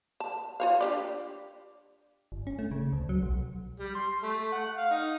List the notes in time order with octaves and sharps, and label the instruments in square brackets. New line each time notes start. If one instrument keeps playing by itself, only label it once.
[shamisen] A5
F4 C#5 F5
D4 G4 D5
[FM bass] G1
C#4
A3
C#3
D2
F#3
B1
[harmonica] G3
C6
A3
F#5
F5
D#4